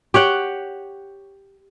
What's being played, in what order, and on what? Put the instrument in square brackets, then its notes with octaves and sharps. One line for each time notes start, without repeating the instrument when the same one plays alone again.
[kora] G4 C#5 F#5 G5